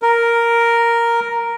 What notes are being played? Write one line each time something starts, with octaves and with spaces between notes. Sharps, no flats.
A#4